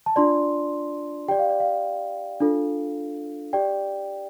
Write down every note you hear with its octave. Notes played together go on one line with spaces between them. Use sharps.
A5
D4 F4 D5 C6
G4 D5 G5
F5
D5
F5
D4 F4 A4
G4 D5 G5